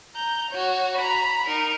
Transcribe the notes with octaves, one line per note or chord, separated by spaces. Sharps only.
A#5 G6
F#4 C#5
A#5 B5
D#4 A#4